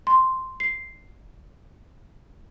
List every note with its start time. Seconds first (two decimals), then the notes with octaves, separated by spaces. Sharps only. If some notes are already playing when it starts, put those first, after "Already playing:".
0.07 C6
0.60 C7